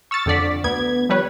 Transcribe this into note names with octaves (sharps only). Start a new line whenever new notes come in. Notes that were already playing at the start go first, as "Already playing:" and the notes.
C#6 E6 F6 A6 C#7
F2 D3 D5 B6
D2 B3 G#6
F3 G3 B4 C#5